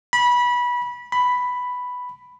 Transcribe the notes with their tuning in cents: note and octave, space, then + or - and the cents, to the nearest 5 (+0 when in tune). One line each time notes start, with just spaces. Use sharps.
B5 -20
B5 +5